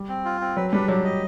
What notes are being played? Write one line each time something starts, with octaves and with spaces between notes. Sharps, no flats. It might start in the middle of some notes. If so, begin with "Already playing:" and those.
Already playing: G3
C4
F4
C4
F#3 B4
G3 D4
F#3 G4
D#5